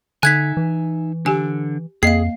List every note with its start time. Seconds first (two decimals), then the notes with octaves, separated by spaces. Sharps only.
0.23 D3 D#4 E5 G#5 F#6 G#6 B6
0.57 E3
1.26 D3 G4 G#5
2.03 F2 A#3 G#4 D#5 F5 C7